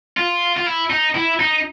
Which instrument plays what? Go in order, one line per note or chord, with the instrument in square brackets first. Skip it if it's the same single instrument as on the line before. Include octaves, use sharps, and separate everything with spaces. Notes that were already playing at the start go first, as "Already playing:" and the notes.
[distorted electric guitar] F4
F4
E4
D#4
E4
D#4